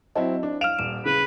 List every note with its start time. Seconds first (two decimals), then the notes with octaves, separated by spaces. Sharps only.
0.16 F#3 C4 E4 D#5 A5
0.43 D4
0.61 F5 F6 D7 E7 F7
0.79 D#1 E7
1.06 C#3 B4